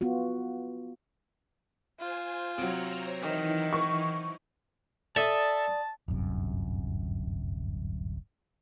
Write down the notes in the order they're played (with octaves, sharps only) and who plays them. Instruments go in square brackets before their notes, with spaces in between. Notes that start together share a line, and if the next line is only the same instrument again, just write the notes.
[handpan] B3 F4 F#4
[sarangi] F4 [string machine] C5 G#5
[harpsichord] C3 F#3 [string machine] C5 C#5 A#5
[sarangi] D#3 [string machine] E3 D#4 E4
[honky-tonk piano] C#6
[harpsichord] A4 E5 [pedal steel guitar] D5 D#6 [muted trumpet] A5
[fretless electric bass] D1 G1 F#2 C3